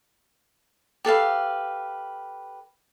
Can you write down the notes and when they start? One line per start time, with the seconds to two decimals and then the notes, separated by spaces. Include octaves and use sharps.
1.05 G4 A4 B4 F5